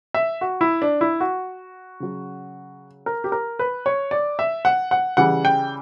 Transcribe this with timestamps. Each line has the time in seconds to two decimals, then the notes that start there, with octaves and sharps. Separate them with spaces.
0.14 E5
0.41 F#4
0.61 E4
0.82 D4
1.01 E4
1.20 F#4
2.00 C#3 F#3
3.06 A#4
3.24 G4
3.32 A#4
3.59 B4
3.86 C#5
4.11 D5
4.39 E5
4.65 F#5
4.91 F#5
5.17 C#3 E3 G3 F#5
5.45 G5